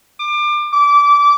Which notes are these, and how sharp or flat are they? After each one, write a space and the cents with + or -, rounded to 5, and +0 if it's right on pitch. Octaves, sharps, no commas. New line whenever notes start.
D6 +25
D6 -20